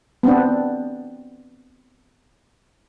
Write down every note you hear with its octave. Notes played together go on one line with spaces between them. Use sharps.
B3 C4 D4